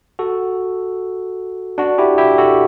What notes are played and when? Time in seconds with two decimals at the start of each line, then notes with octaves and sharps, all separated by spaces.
0.19 F#4 A4
1.78 D4 F#4
1.98 E4 G4
2.18 E4 G4
2.38 F#4 A4